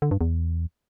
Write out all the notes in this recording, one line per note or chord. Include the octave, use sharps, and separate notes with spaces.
D3
G2
E2